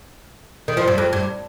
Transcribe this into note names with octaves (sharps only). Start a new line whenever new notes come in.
D#3
F3
G2
F2
G2